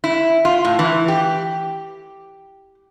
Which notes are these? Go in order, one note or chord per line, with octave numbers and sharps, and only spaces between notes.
E4
F4
A2
E3
G4